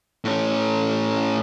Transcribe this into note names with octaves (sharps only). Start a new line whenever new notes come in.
A2 C#4